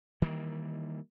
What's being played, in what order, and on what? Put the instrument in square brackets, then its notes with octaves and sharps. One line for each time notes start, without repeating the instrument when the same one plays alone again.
[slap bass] D#3 E3 G3 A#3